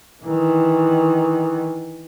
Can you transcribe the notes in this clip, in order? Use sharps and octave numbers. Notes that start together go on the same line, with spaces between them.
D#3 E3